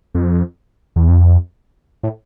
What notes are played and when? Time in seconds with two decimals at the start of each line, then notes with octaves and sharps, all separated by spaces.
0.15 F2
0.96 E2
1.09 F2
2.03 A2